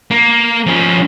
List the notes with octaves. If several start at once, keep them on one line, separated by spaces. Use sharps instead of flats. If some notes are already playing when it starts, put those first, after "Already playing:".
A#3
F3 C#4